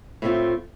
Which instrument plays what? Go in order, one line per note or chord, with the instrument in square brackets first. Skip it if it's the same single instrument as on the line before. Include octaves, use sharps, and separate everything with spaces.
[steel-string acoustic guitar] A2 A3 C4 F4